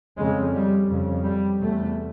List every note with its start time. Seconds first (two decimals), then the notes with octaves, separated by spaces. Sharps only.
0.18 F2 C#3 G#3
0.54 G3
0.90 F2 C#3
1.24 G3
1.60 E2 C3 A3